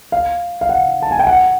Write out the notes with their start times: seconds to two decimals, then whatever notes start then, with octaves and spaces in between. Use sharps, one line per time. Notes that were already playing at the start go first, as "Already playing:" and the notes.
0.12 F5
0.61 F5
0.69 F#5
1.02 A5
1.11 G#5
1.19 G5
1.27 F#5